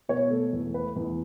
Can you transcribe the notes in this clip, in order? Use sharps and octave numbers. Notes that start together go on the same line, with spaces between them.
B2 C#5
A3 A4
E2
A3 B4
E2